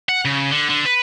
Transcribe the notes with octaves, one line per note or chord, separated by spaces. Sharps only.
F#5
C#3
D3
D3
B4